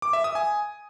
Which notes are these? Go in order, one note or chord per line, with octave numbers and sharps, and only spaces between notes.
D6
E5
D#6
G#5